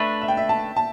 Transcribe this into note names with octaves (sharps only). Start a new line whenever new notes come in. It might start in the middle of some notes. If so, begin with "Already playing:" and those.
Already playing: A3 D4 B4 E5
E5
G5
E5
A5
A5